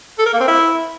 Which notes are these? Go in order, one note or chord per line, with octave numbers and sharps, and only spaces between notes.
A4
A#4
A#3
C4
E4